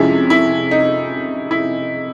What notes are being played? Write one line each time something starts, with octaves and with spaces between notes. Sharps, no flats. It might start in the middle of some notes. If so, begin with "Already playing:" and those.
Already playing: F2 C3 F3 G#3 C#4 E4
E4
D#4
E4